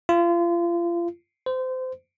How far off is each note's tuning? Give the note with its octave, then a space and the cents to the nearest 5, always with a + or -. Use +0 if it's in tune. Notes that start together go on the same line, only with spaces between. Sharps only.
F4 -30
C5 -25